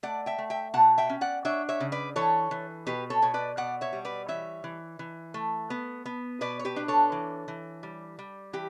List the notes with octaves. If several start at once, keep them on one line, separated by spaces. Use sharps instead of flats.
A3 D5 F#5
E5 G5
A3
E5 G5
B2 F#5 A5
E5 G5
C#4
D5 F#5
D4 C#5 E5
C#5 E5
C#3
B4 D5
E3 A4 C#5
E3
B2 G4 B4
A4 C#5
B2 C#5
B4 D5
B2 D5 F#5
C#5 E5
G3
B4 D5
E3 C#5 E5
E3
E3
A3
B3
B3
B2 B4 D5
C#5
G4 B4
D4
A4 C#5
E3
E3
G3
G3
E3 G4